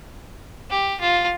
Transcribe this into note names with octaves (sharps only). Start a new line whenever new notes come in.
G4
F4